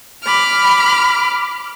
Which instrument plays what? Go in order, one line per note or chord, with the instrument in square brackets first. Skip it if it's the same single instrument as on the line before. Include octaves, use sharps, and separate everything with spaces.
[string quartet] B5 D6 F6